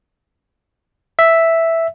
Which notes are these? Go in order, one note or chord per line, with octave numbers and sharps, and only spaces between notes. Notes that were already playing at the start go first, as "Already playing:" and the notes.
E5